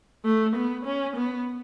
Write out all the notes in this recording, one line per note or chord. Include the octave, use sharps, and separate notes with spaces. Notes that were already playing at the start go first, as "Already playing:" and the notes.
A3
B3
C#4
B3